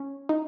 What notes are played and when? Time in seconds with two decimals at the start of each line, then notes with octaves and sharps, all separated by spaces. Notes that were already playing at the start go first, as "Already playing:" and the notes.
Already playing: C#4
0.29 D#4